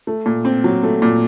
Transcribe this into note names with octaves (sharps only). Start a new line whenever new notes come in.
A3
A#2
C4
F#3
A3
A#2